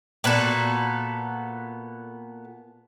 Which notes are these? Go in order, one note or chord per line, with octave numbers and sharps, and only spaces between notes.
A#2 B3 F#4 A4